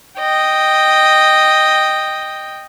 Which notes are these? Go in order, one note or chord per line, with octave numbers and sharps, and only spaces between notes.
D#5 G5